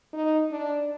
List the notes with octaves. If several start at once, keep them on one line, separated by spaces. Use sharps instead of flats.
D#4
D4